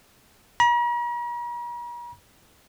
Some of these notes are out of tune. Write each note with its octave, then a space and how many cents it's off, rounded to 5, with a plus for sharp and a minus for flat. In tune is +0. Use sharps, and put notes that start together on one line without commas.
A#5 +45